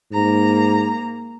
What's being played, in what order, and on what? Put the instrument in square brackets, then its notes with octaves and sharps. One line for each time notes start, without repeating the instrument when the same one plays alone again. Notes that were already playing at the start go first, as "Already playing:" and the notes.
[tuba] G#2 [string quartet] A#3 A#5